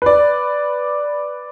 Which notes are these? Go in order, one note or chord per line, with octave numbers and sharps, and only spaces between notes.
B4 D5